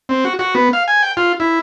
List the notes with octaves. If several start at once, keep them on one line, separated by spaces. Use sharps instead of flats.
C4
F#4
F#4
B3
F5
G#5
G5
F4
E4